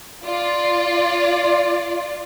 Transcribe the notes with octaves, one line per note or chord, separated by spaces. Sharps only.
F4 D5